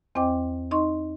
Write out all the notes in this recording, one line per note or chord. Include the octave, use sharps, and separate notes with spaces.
E2 C4 C5 D#5 G5 D6
D#4 D#5 C6 C#6